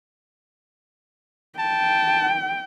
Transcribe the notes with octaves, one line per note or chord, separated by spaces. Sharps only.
G5 A5